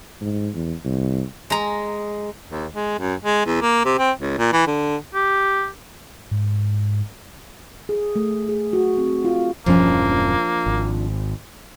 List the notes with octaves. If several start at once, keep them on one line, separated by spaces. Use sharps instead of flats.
G#2
E2
C2
G#3 A#5
D#2
G#3
F#2
G#3
E2
A#3
C3
C4
C#2
A#2
E3
D3
G4
G#2
G#4
A3
G#4
F#4
C4
F4
E1 G2 F3 A#3 C#4 D4
G#1